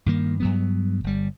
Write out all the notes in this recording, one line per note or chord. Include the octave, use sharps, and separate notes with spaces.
G2 D#3 A#3
G2 F#3 B3
G1 G3